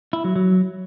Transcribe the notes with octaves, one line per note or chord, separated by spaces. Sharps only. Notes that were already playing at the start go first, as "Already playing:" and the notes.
E4
F#3
F#3